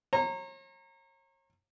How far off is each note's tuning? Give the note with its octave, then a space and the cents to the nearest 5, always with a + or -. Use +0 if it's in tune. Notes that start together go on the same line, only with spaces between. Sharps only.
C#5 -40 A#5 -15